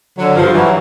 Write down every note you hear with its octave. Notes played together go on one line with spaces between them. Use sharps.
D3 F#3
G2 F3
E3 F#3